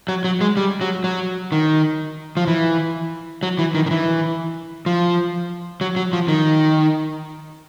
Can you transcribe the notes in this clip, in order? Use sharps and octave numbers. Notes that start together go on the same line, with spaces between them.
F#3
F#3
G#3
G3
F#3
F#3
D#3
F3
E3
F#3
E3
D#3
D#3
E3
F3
F#3
F#3
F3
D#3